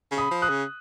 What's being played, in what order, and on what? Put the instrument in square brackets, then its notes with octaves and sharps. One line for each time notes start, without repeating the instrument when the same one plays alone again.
[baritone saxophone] C#3
[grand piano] B5 D#6
[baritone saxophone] F3
[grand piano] D#6 F#6
[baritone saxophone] C#3